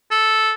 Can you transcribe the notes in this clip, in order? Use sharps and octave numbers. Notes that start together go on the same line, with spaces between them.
A4